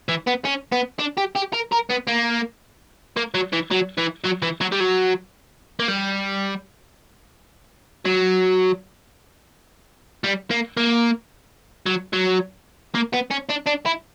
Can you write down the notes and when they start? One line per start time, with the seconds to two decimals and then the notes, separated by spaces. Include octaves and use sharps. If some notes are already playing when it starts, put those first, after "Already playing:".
0.08 E3
0.27 B3
0.45 C#4
0.72 B3
0.99 D4
1.17 G4
1.35 G4
1.53 A#4
1.72 A#4
1.90 B3
2.07 A#3
3.17 A#3
3.34 F#3
3.53 E3
3.71 F#3
3.98 E3
4.25 F#3
4.43 E3
4.61 F#3
4.72 G3
4.80 F#3
5.80 A#3
5.88 G3
8.05 F#3
10.24 G3
10.51 A#3
10.77 A#3
11.86 F#3
12.13 F#3
12.95 A#3
13.13 B3
13.31 C#4
13.50 D4
13.67 D4
13.86 E4